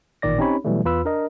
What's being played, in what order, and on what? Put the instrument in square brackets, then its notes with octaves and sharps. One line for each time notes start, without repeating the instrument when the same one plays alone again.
[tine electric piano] A1 A#2 D#3 D5 A#6
C4 C#4 D#4 G4 C#5 B5
B2 E3 F#3 G3 A3
E2 F4 B4 B5 E6
D4 A#4 D#5